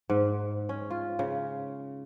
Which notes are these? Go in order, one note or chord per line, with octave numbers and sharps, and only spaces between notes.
G#2
C#4
F4
C#3